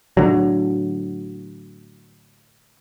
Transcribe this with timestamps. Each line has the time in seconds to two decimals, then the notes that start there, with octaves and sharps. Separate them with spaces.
0.17 A2 D3 F#3